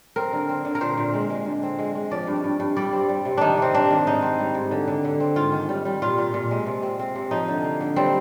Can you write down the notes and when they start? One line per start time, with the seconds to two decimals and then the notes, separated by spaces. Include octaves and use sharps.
0.16 C4 A#4
0.33 D3
0.49 C4
0.65 D3
0.75 A#4
0.81 A#2 C5
0.98 A#2
1.14 G#3
1.30 G#3
1.46 D3
1.63 C4
1.79 G#3
1.95 G#3
2.11 F3 D5
2.27 G2
2.44 G2
2.60 G2
2.76 G3 D5
2.93 C4
3.09 G3
3.25 C3
3.38 D#3 D4 D#4
3.58 C3 C4
3.74 C3 D4
3.90 D#3
4.07 G#2 D#4
4.22 C4
4.39 G3
4.55 G#2
4.71 D3
4.88 D3
5.05 D3
5.20 C4
5.36 G#2 F4
5.52 D#3
5.69 G3
5.85 G3
6.02 A#2 F4
6.18 A#2
6.34 A#2
6.51 G#3
6.66 C3
6.83 C4
6.99 C4
7.15 C3
7.31 F3 D#4
7.48 D3
7.64 A#3
7.81 D3
7.96 G3 C4